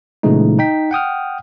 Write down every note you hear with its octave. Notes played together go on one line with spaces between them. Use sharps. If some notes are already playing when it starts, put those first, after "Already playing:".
A#2 C#3 E3 G#3 A3 D#4
D#4 G5 B6
F#5 G5 D#6 F6